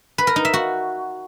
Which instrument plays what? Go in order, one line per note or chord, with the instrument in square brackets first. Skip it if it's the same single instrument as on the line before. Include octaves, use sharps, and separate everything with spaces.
[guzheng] B4
A#4
D#4
E5
F#4